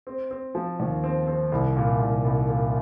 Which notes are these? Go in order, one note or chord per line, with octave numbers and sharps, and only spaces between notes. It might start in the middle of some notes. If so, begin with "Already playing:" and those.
C4
C4
F3
D#2
C4
C4
C2
A#2
C2
C2
A#2